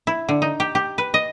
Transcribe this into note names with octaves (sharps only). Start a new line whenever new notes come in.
E4
D3
D#4
G4
G4
B4
D#5